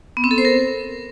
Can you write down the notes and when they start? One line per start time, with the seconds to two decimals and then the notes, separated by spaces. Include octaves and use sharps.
0.17 B3
0.24 C4
0.31 A4
0.38 C5
0.45 A#4